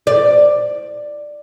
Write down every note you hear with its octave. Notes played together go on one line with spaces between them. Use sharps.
D5